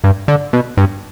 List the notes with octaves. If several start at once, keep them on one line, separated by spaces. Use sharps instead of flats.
G2
D3
B2
G2